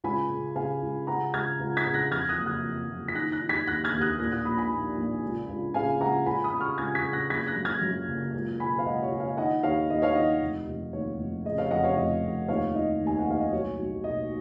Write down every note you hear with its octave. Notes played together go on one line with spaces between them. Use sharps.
C#2 G#5 B5
C#3
C#3 F5 G#5
C#2
C#3 F#5 A#5
C#2 F6 G#6
C#2
G#6 B6
C#3
F#6 A#6
F2 F6 G#6
D#6 F#6
F#1
D#6 F#6
F2
F#1
B6
D#3 F#6 A#6
F#6 A#6
D#3
G#6 B6
D#2 F#6 A#6
F6 G#6
D#2
D#6 F#6
A#2 F#6 A#6
D#6 F#6
A#1 B5 D#6
G#5 B5
A#1
A#1
C#2
C#2
C#3 F5 G#5
C#2 F#5 A#5
C#2 G#5 B5
B5 D#6
C#3
C#6 F6
C#2 F6 G#6
G#6 B6
C#3
F#6 A#6
F#1 G#6 B6
F#6 A#6
F#2
F6 G#6
F#2
F#1
C#2
B2 G#5 B5
F5
C#2 D#5 F#5
C#5
C#2
C#5 F5
D#3 D#5 F#5
D#2 C#5 F5
D#2 D#5
C#5 F5
D#3 D#5
F1
F1
D#2 C#5
F1
C#3 D#5
C#5 F5
F2 D#5 F#5
C#5 F5
F1 D#5
F2
D#2 C#5 F5
D#3 D#5
D#2
G#5
F#5
D#2 F5
D#5
B1 C#5
B1
B2 D#5